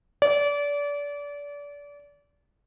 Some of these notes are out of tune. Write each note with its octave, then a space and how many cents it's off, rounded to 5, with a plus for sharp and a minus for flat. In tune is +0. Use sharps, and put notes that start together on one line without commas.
D5 -30